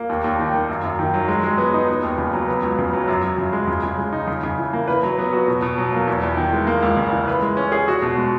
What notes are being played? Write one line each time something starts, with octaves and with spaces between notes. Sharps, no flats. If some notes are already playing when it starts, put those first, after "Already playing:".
Already playing: A#3
D#2
D#2
D#3
A#3
F#2
F#2
D#3
F#3
G#3
G#3
B3
D#4
B3
D#2
C#3
F#3
B3
C#2
C#3
F#3
F#2
F#2
C#3
G#3
C#3
C#3
G#3
D#4
C#3
C#3
E3
A#3
B4
F#3
B3
F#4
B2
B2
F#3
A#3
E2
E2
D#3
G#3
A#3
C#2
C#3
E3
B4
G#3
C#4
G#4
F#4
B2
G#3